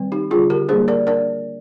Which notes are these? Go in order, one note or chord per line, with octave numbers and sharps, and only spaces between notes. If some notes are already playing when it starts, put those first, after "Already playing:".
Already playing: D#3 G3 C4
D#4 G4
D3 G3 D4 F4 G#4
G4 A#4
G3 A#3 D4 G#4 C5
A#4 D5
D4 A#4 D5